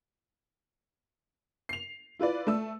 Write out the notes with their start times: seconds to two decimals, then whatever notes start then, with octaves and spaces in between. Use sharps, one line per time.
1.69 C7 F7
2.19 E4 F4 B4 D5
2.47 A3 E6